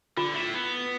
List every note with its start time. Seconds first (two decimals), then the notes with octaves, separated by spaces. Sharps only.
0.17 D3 F4
0.34 A3 E4
0.54 B3